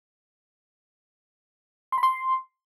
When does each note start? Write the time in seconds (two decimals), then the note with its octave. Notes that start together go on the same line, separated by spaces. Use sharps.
1.92 C6
1.98 B5
2.03 C6